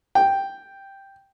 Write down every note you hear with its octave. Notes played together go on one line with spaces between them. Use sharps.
G5